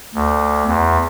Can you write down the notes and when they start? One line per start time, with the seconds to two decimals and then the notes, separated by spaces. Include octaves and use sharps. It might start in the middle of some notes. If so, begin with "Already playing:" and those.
0.15 D2
0.67 E2